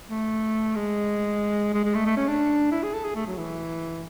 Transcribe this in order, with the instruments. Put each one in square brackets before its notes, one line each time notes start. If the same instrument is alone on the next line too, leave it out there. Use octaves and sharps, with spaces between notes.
[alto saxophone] A3
G#3
G#3
G#3
A3
A3
C#4
D4
E4
G#4
A4
G#4
A3
F#3
E3